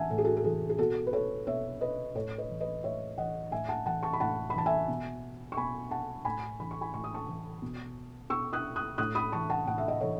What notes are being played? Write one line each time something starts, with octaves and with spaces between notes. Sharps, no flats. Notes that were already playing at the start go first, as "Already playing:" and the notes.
Already playing: A2 E3 E5 F#5 G#5 A5
A2 A4
G#4
F#4 A4
A4
E3 G#4
G#4
B2 F#4 A4
B4
A4 C#5
B2 C#5 E5
B4 D#5
A2 A4 C#5
B4 D#5
E3
B4 D#5
A2 C#5 E5
E3 D#5 F#5
A2 E5 G#5
F#5 A5
E3 F#5 A5
A5 C#6
B5
A2 F#5 A5
B5
E3 A5
E5 G#5
B2
C#6
B2 G#5 B5
F#5 A5
A2 G#5 B5
E3 B5
C#6
G#5 B5
A2 C#6
D#6
A5 C#6
E3
B2
B2 C#6 E6
D#6 F#6
D#6 F#6
A2 D#6 F#6
B5 D#6
E3 A5 C#6
F#5 A5
A2 F#5
E5
D#5 F#5
E3 A4 C#5